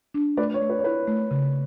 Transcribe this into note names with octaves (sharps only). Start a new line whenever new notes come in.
D4
A3 B4 D5
C#5
A3
B4
C#5
E4 B4
A3
C#3